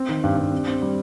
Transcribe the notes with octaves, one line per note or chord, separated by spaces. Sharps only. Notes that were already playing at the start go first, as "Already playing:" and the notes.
Already playing: C4
D#3
G2
G2
C4
C4
G3